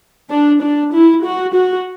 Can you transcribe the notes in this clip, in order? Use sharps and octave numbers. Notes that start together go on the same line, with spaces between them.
D4
D4
E4
F#4
F#4